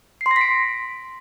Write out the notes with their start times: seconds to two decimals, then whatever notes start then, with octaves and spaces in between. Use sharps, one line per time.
0.21 C7
0.26 C6
0.31 A#6
0.36 B6
0.41 D7